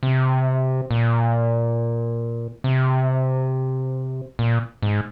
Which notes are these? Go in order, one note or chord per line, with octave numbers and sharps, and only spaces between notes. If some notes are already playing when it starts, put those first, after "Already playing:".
C3
A#2
C3
A#2
G#2